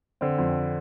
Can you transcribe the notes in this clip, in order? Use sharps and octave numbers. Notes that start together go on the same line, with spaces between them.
D3 C4
F2